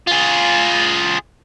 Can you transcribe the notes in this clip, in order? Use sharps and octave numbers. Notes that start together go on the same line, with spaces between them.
F4 G#4